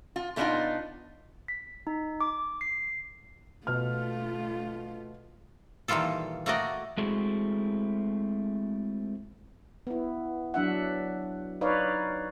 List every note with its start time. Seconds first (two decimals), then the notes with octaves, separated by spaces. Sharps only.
0.16 F4
0.36 B2 A3 B3 D4 D#4 F4
1.48 B6
1.87 D#4
2.21 D6
2.61 C7
3.67 B2 A3 F4 F6
5.88 A#2 D#3 E3 G3 F4 A4
6.46 A3 A#3 F#4 D5 D#5
6.97 G#3 A3 C4 E4 F#4 G#4
9.87 B3 E4
10.54 F#3 D4 E5 F#5
11.61 D#4 B4 C#5 D5 F5